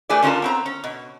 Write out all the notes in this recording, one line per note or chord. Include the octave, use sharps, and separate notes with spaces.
A3 G4 G#4 B4 D5
D3 C#4 F4 A#4 A5
B3 C4 A#5
C#4
B2